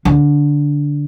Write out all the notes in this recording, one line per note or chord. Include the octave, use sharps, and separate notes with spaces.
D3